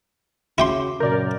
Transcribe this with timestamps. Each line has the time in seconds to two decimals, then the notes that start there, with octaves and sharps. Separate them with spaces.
0.58 C#3 E4 F#4 G5 C6 D6
1.00 F#2 A#2 C#3 A#4 D5 G6